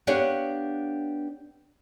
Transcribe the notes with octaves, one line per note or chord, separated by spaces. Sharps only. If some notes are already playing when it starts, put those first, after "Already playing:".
B3 D4 G4 C#5 F5 F#5